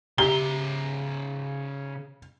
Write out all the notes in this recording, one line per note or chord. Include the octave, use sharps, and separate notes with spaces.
C#3 G4 E5 A#5 G7